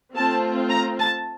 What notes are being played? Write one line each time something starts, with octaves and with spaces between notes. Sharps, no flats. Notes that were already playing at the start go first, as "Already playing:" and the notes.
A3 C4 F4 A5
A#5
A5